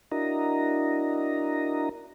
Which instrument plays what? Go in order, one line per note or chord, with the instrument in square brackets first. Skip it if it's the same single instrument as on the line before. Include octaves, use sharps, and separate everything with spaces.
[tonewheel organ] D4 E4 F#4 A#4 D#5 A#5